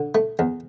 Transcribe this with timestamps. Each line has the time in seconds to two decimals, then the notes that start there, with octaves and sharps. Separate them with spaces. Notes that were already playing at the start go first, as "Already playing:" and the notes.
Already playing: D3
0.15 A3
0.39 E2